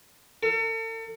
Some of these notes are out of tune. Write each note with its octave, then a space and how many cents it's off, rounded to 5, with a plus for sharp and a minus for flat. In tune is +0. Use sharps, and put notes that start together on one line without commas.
A4 +40